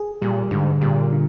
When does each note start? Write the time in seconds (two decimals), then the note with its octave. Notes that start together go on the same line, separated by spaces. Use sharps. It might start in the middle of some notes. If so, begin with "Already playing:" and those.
Already playing: G#4
0.22 A#2 G3
0.51 G#2 D3
0.81 A#2 G3
1.12 D3